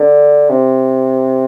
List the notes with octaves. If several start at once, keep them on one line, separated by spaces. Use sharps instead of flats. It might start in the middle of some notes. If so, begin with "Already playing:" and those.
Already playing: D3
C3